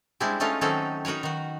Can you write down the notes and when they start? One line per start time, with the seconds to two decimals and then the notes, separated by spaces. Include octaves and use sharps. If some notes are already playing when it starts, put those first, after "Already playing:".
0.20 G3 G#3 C4 D4 E4
0.40 G#3 A3 C#4 D#4 F4
0.61 D#3 F#3 C4 C#4 D#4 A4
1.05 D#4 F#4 A#4 B4 C#5
1.23 D#3 F#4